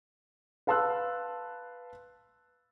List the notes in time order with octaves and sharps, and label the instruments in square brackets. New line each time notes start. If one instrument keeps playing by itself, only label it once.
[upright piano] B4 F5 A5 C6 E6 F#6